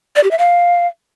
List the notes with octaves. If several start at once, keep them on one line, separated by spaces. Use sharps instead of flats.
D5
G4
E5
F5